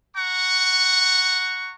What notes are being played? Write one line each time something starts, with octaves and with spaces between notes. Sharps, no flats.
F#5 A#5 C#6